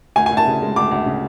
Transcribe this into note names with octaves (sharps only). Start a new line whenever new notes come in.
D2 G#5
G#5
D2
A5
C#3
G#3
D2 D6
D2
C#3